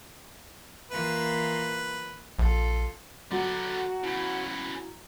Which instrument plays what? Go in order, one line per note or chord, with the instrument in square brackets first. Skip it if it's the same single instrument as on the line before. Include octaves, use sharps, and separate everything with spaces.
[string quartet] E3 A#3 F4 [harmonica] B4
[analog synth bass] A#1 [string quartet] F4 A4
[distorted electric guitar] D3 B3 [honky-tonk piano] F#3 [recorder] F#4
[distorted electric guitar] C#3 B3 [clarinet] E4